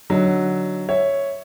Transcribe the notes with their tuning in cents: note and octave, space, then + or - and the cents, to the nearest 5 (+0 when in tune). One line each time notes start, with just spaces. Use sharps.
D3 +0 F#3 +0 D#4 +0
C#5 +0 E5 +0